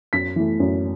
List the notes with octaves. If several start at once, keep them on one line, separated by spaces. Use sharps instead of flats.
F#2 B6
E3 A3
F#2